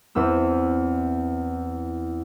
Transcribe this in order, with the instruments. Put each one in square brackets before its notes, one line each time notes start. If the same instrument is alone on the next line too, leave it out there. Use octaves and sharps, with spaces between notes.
[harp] E2 E3 C4 E6